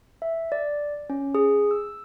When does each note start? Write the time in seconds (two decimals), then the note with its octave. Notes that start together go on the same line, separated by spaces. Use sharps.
0.22 E5
0.52 D5
1.10 C#4
1.35 G#4
1.71 E6